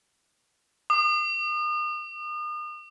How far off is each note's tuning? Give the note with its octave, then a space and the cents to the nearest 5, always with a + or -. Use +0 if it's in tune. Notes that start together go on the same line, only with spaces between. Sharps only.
D#6 -40